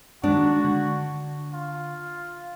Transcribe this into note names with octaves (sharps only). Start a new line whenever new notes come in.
D#3 G#3 D4 F#4
D3
F4